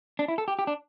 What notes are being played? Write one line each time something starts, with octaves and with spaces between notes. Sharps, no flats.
D4
E4
A4
G4
G4
D4